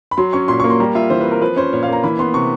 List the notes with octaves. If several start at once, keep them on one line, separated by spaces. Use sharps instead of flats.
B5
F#3 C6
C#4 C#6
A#2 C6
C#6
A#3
C6
G3 A#5
F4 E5
E3 C5
B4
C4
A#4
F3 B4
C#4 C5
A#2 C#5
F5
A#3 A#5
E3 B5
B3 C6
C3 C#6